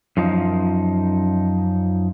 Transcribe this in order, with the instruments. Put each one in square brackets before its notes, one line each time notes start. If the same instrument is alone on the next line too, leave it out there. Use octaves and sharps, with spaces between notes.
[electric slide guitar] F#2 F3 D#4